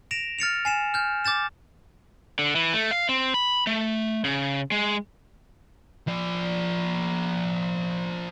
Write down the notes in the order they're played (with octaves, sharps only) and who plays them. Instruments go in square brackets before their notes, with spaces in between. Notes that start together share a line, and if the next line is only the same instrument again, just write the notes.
[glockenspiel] A#6 D7 E7 F7
F6 A6 C#7 F7
G#5 C7 E7
F6 G6
D6 G6 A6 E7
[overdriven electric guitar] D3
E3
A3
F5
C4
B5
A3
C#3
G#3
[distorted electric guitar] F3 D5